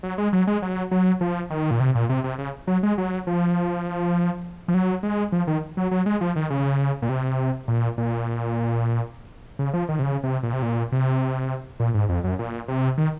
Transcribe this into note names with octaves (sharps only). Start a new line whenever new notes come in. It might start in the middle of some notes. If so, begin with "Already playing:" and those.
F#3
G#3
F#3
G#3
F#3
F#3
F3
D#3
A#2
C3
A#2
C3
C3
C#3
F#3
G#3
F#3
F3
F3
F#3
G#3
F3
D#3
F#3
F#3
G#3
F3
D#3
C#3
A#2
C3
A#2
A#2
C#3
F3
D#3
C3
C#3
C3
A#2
C3
A#2
C3
A#2
G#2
F2
F#2
A#2
C3
D#3